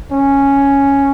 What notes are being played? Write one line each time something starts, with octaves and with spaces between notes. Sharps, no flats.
C#4